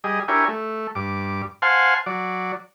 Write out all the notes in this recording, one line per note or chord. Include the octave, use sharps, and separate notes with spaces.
G3 G#4 D#5
D4 E4 G4 A#4 C#5 G#5
A3
G2 D6
C5 F5 F#5 G#5 A5 C6
F#3 D5